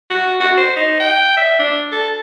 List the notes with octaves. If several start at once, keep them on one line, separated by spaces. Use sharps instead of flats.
F#4
F#4
C5
D#4
G5
E5
D4
A4